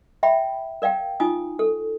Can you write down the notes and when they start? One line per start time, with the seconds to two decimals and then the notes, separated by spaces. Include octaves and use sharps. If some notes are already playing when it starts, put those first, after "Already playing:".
0.23 E5 G5 B5
0.82 A#4 D5 F5 G5
1.20 D#4 F4 G#5 D#6
1.59 A4